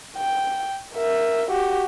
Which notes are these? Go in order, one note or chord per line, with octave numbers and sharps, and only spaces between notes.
G5
A#4 E5
F#4 G4